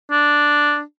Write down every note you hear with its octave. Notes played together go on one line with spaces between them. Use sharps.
D4